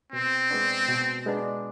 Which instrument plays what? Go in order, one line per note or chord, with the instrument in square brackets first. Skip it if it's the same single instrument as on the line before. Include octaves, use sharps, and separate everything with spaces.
[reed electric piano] B2 [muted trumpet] C4
[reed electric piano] G#3 B3 D4
B2
G#3 B3 D4